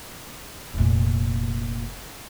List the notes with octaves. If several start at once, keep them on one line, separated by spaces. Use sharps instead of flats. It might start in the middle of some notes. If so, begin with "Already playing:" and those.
F1 A#2